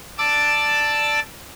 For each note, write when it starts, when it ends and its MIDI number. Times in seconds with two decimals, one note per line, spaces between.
0.18 1.20 74
0.18 1.20 81
0.18 1.20 86
0.18 1.20 88